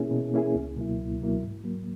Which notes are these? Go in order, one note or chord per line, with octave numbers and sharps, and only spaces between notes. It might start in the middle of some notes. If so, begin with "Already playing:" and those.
Already playing: B2 A#3 C#4 E4 G#4
B2
A#3 C#4 E4 G#4
C#2
B2 F#3 A#3 E4
C#2
B2 F#3 A#3 E4
G#2
F#3 A#3